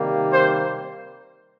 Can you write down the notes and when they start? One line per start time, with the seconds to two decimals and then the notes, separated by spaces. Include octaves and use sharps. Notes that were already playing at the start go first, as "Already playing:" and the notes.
Already playing: C3 D#3 G3 A#3
0.31 C5